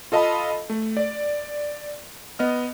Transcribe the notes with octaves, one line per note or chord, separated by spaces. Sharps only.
F4 A4 D#5 F5 A5 B5
A3
D5
B3 D#5 F6